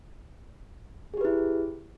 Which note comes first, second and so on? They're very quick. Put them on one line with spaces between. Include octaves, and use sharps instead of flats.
G#4 G4 B4 E4